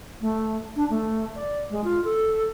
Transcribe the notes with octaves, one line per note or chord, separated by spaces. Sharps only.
A3
D4
A3
D5
G#3
F4
A4